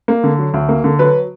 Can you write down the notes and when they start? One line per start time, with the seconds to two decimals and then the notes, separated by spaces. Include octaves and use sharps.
0.08 A#3
0.24 D3
0.38 F#3
0.54 D2
0.69 A#3
0.84 D3
0.99 F#3 B4